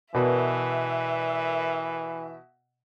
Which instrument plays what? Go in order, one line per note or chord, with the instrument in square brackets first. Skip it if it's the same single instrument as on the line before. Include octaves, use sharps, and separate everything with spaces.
[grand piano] B2 [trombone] E3 [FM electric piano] A#4 B4 D5 [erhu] E5